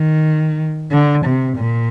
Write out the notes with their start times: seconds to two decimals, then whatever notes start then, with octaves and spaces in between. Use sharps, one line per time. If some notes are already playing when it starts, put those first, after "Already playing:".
Already playing: D#3
0.92 D3
1.25 C3
1.58 A#2